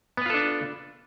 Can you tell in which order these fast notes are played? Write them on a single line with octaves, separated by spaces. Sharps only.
B3 B4 F4 A4 D4